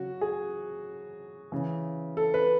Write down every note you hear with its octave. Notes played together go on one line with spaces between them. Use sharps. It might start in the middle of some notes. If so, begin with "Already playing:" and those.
Already playing: C#3 F#3 F#4
G#4
C#3 E3
A4
B4